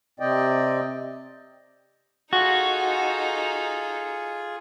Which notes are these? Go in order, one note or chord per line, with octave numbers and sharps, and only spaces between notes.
C3 C4 D5 D#5 G5
D#4 F4 F#4 G#4 A4